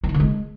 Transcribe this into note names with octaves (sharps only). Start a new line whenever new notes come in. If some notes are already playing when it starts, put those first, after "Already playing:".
E3
D#3
D3
G#3